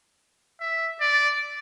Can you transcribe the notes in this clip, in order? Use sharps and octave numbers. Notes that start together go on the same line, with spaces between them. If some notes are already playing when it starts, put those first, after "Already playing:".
E5
D5